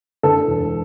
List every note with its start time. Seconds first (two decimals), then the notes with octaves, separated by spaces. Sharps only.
0.23 D3 A4
0.47 E1